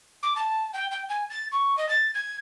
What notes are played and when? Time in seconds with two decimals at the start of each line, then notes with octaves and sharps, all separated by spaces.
0.22 D6
0.35 A5
0.73 G5
0.91 G5
1.09 G#5
1.30 A6
1.51 C#6
1.77 D#5
1.88 A6
2.14 G#6